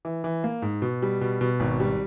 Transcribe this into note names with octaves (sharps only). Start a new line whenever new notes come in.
E3
E3
A#3
G#2
B2
G3
B2
B2
G#1
G3